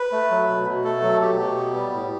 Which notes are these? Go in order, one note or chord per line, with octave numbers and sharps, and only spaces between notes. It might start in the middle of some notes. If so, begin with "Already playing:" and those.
Already playing: B4
A3
F#3
B2
B2
A3 A4
F#3
B2 G4
B2
B3
G3
A2